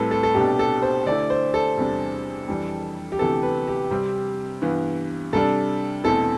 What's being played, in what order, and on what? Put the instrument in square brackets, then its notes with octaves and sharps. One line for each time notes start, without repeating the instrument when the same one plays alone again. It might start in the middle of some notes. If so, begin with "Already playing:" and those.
Already playing: [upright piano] A2 G3 C4 E4 [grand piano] A4 B4
[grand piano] A4
A4
[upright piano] C2 B2 A3 D4 [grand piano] G4
[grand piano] A4
C5
[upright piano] D2 D3 A3 E4 [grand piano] D5
[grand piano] C5
A4
[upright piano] E2 C3 G3 D4
F2 E3 G3 D4
[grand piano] G4
[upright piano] D2 C3 E3 B3 [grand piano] A4
[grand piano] B4
G4
[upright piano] C3 G3 C4
G2 E3 B3
[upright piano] C3 G3 D4 [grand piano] A4
[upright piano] E2 B2 A3 C4 E4 [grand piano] A4